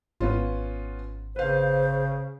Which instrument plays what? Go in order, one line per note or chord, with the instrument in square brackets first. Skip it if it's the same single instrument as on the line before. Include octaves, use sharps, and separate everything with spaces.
[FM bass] G#1 [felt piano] B3 C#4 F4
[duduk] C#3 [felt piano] B4 F5 [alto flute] C5